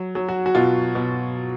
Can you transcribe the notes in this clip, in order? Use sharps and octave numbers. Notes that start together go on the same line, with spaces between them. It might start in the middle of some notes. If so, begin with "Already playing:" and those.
Already playing: F#3
F#3
F#4
F#4
B2 F4
B2